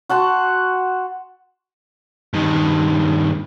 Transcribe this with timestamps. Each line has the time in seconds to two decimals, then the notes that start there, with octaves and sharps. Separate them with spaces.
0.09 F#4 F#5 A5 C6
2.34 G2 D#3